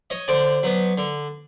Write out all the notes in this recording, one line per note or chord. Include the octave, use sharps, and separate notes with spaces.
C#5 D#5
D3 C5 D5
F#3 B3
D3